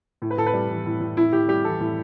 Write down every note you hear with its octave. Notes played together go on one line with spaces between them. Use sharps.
A2
B4
A2 A4
B4
G3
E3
A2
A2
A2 E4
A2 G4
G3 G4
E3 A4
A2